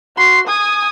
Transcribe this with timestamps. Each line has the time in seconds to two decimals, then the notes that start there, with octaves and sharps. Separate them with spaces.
0.17 F#4 C6
0.47 G#5 D#6